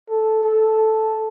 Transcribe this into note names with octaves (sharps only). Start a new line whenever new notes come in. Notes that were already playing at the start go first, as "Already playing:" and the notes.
A4
A4